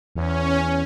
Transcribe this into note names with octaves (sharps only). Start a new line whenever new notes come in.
E2 C#4